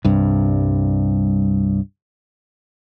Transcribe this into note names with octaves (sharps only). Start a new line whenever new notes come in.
C2 G2